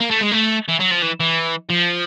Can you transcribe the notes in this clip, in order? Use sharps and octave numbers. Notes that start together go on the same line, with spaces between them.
A#3
A3
G#3
A3
E3
F#3
F3
E3
E3
F3